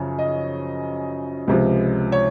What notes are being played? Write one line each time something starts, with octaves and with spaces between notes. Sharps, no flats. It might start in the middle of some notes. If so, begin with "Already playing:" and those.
Already playing: F#2 C#3 F3
D#5
C#2 C3 F3
C#5